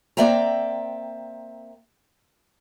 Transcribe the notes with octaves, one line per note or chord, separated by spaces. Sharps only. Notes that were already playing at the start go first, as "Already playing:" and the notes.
A#3 C4 D5 E5 G5 A#5